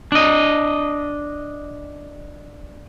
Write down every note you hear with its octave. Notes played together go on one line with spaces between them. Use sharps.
D4 D#5